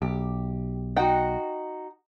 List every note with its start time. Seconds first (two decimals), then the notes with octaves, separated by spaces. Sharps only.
0.02 B1 G4
0.97 D#4 F#4 F#5 G5